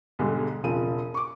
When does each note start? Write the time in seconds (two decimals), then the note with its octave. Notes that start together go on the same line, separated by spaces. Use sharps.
0.19 B1 G#2 D3 G3 G#3
0.63 E1 C#3 F3 C4 D#7
1.14 C#6 D6